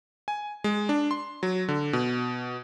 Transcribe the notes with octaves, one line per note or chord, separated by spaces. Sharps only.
G#5
G#3
D4
C6
F#3
D3
B2